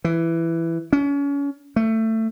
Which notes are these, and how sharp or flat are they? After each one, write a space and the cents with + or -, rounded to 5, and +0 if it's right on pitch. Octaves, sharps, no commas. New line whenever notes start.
E3 +10
C#4 +30
A3 +20